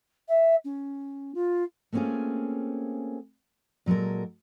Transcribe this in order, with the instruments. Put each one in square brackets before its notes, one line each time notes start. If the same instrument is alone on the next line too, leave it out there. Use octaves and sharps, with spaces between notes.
[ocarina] E5
C#4
F4
[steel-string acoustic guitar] A3 A#3 C4 C#4 F4 G#4
A#2 F#3 G#3 A4 A#4